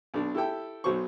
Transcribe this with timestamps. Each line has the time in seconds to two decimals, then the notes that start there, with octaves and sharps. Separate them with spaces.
0.14 B1 D4
0.35 E4 G4 A4 G5
0.84 B1 F#3 C5 C#6